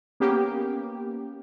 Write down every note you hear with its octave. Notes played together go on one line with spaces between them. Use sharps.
A#3 B3 C#4 G4